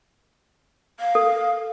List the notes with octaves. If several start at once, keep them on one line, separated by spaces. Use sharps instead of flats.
F5
A4